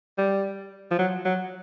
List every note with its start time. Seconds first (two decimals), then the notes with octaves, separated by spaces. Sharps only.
0.18 G3
0.91 F3
0.98 F#3
1.25 F#3